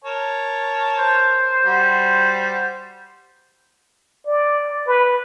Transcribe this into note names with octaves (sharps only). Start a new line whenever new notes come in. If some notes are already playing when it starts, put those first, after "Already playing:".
A#4 C#5 A5
C5
G3 F#4
D5
B4